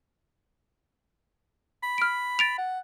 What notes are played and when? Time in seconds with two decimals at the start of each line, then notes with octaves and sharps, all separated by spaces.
1.83 B5
1.98 F6 D7
2.39 A6 D7 F7
2.58 F#5